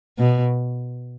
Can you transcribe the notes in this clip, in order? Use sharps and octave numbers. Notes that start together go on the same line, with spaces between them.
B2